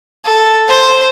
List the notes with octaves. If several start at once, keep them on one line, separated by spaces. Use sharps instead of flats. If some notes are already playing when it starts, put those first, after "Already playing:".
A4
C5